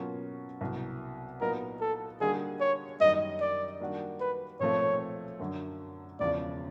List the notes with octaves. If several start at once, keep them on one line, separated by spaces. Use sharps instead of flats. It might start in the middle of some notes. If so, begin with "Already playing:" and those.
Already playing: B2 F#3 A#3 C#4 F4
C2 B2 F#3
A#2 F#3 B3 D#4 A#4
A4
D3 G3 A#3 D#4 F#4 G#4
C#5
F#2 D#3 G3 A#3 D#4 D#5
D5
D#3 G3 A#3 D4 F#4
B4
B1 A#2 F3 A3 C4 C#5
F#2 D3 F#3
E1 E2 C#3 F3 D5